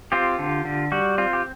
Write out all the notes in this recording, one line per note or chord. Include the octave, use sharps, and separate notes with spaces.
C4 F4 G4
D3
D3
G3 F#4
C4 F4
G4